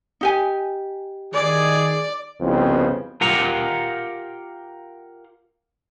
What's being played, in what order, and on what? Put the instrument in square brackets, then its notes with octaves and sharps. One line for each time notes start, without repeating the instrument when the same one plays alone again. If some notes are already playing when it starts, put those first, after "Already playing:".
[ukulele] D#4 G4 G#5
[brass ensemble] D#3 G#4 [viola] D5
[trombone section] C2 F2 C#3 B3 C4
[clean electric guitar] F4 G4 A#4 F#5 A#5